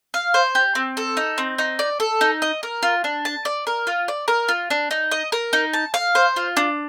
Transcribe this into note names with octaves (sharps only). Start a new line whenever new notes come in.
F5
C5
G4
C4
A4
D#4
C4
D#4
D5
A4
D#4
D#5
A#4
F4
D4
A5
D5
A#4
F4
D5
A#4
F4
D4
D#4
D#5
A#4
D#4
A5
F5
C5
F4
D4